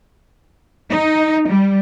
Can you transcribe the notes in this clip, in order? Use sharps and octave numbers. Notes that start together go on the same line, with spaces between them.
D#4
G3